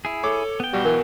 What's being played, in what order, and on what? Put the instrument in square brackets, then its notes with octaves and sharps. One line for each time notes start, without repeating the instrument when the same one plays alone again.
[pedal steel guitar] E4 G#4
[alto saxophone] A4 [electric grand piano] C#5 D6
[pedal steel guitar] B3 G5
[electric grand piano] B1 F#4 [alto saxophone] G3
[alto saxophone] E3 [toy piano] A#4 G#5